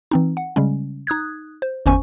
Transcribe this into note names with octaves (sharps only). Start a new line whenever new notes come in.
E3 C4 D#4
F#5
C#3 G3 G#3 C#4
D#4 D#6 F#6 G#6
C5
G1 E2 C#4 C5 G#5 C#6